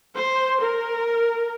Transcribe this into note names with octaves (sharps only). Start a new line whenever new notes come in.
C5
A#4